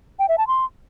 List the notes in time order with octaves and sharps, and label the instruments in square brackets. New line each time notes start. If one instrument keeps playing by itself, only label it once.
[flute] G5
E5
A5
C6